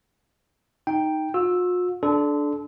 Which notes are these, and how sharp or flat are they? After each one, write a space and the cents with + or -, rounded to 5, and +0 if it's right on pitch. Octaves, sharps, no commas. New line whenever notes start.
D#4 +0 G5 +0
F4 +45 E6 +0
D4 +0 A4 -30 C6 -35